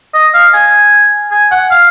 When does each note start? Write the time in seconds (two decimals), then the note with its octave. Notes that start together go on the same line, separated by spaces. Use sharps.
0.14 D#5
0.34 F5
0.54 G#5
1.31 G#5
1.51 F#5
1.71 F5